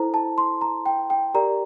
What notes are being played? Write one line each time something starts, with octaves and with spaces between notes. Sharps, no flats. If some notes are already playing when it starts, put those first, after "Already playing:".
Already playing: E4 A4 C5 A#5
A5
C6
A#5
G5
G5
G4 A#4 D5 A#5